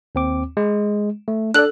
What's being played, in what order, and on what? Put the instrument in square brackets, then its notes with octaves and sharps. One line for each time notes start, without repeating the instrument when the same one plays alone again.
[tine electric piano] D#2 C4 D6
G#3
A3
[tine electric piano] D4 D5 [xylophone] A4 F#6